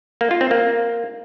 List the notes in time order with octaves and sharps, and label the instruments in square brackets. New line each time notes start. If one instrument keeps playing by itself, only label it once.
[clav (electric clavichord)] A#3
F4
C4
A#3